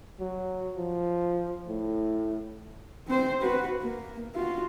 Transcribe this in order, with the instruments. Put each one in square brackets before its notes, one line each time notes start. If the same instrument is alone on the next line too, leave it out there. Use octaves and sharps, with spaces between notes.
[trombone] F#3
F3
A2
[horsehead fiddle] C4 C5
F#4 B4
A#3
F4 F#4